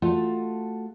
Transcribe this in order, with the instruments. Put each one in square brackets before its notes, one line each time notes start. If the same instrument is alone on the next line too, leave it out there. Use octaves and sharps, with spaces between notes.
[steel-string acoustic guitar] A3 F4 F#4 A4